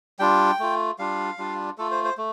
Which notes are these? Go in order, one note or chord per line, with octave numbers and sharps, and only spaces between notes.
G3 D4 F4 G5
A3 F4
G3 D4 F4 F5
G3 D4 F4
A3 F4 A4
C5
C5
A3